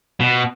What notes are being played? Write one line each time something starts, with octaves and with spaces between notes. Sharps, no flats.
B2